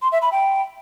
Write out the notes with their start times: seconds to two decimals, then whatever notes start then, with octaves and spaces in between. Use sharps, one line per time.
0.02 C6
0.12 E5
0.22 B5
0.32 G5